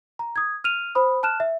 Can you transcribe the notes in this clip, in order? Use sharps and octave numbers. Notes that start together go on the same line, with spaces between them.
A#5
D#6 G#6
F6 D#7 F7
C5 B5 D#6
A5 F6 F#6 E7
E5